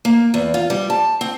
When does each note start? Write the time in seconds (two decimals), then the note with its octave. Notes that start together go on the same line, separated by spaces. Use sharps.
0.05 A#3
0.34 E2
0.54 F4
0.70 G3
0.90 A5
1.21 C4